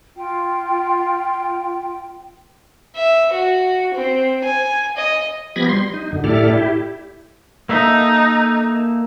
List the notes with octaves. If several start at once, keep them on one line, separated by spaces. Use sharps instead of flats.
F4 G5
E5
F#4
C4
G#5
D#5
F3 B3 G4 B5 G#6 A#6
G3 C6
D#4
F#2 D3
A2 E4 G4 A4 D5 F6
E4 G4
A#3 D#4 A4 E5